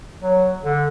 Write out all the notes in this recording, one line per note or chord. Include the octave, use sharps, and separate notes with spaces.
F#3
D3